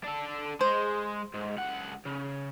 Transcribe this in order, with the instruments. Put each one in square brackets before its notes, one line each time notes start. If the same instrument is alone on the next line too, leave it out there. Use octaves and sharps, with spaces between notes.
[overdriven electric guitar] D4 A4
[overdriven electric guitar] G#3 [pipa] C5
[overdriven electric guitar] G#2
C#2 F#5
C#3